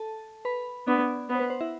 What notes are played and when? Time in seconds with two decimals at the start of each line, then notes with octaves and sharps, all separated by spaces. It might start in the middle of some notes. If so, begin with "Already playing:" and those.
Already playing: A4 A5
0.45 B4 B5
0.87 B3 D4 D5
1.29 B3 B4
1.35 C5
1.39 B4
1.50 C5
1.61 E4 E5